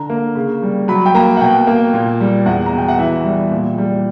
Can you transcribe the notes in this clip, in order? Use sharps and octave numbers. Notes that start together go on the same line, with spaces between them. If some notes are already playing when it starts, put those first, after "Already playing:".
Already playing: D3 A#5
A#3
C#3
G3
F#3 B5
G5
A#3 A#5
F#5
B2 G5
A#3
A#2
G3
E2 F#5
A#5
B2 G5
F#5
E3 E5
G3
A#2
G3